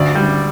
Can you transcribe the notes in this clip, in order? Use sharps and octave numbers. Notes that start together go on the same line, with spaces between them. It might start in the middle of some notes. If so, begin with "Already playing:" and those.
Already playing: D2 D5
G3